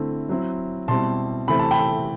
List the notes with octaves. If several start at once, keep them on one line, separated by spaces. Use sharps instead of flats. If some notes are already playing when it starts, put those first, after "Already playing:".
Already playing: D3 A3 C4 E4
F#3 C4 E4
B2 G3 C4 E4 A5 C6
C3 E3 A3 C4 B5
A5
G5 B5